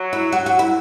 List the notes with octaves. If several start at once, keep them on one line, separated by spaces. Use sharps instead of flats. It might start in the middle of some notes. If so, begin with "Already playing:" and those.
Already playing: F#3
E4
F#4
F#4
E4